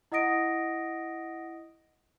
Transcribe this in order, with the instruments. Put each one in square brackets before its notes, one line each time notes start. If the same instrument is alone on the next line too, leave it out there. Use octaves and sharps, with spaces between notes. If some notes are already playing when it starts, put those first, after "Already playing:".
[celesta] E4 D#5 F#5 D#6 A#6 D7